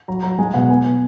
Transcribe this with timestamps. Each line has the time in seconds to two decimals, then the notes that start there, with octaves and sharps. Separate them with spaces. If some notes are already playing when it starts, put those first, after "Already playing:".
0.08 F#3 A#5
0.23 F#3 A#5
0.38 G#3 G#5
0.54 B2 F#5
0.69 B3 G#5
0.84 B3